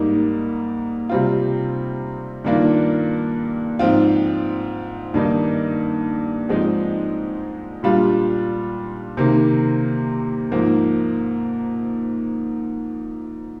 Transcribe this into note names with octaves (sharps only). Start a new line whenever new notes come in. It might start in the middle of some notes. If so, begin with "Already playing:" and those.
Already playing: G#2 G3 A#3 D#4
C3 G3 C4 F4
G2 D#3 A#3 D4 F4
G#2 F3 C4 F4
G2 D#3 A#3 D#4
G#2 F3 G#3 C4 D#4
A#2 G3 D4 F4
C3 D#3 A#3
G#2 F3 A#3